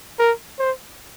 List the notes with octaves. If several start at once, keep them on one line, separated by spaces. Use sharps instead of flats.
A#4
C5